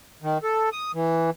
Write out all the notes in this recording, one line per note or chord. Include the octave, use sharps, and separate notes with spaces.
D#3
A4
D#6
E3